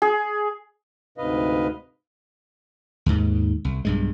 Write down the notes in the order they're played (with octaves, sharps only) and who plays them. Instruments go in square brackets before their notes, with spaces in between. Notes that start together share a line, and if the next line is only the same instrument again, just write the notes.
[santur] G#4
[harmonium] D2 G#2 C3 B4 D#5 F5
[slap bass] D#2 G#2
C2
B1 G2 G#3